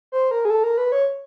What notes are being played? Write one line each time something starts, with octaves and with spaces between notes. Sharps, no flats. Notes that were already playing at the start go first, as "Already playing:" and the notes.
C5
A#4
G#4
A4
A#4
B4
C#5